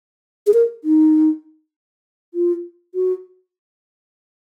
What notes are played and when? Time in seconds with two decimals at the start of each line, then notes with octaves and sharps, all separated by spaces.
0.47 G#4
0.54 A#4
0.84 D#4
2.34 F4
2.95 F#4